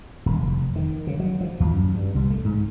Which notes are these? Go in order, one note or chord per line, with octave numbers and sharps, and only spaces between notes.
D#1
F1
D#3
C#3
F#3
F3
D#2
F#2
G2
C2
A3
G#2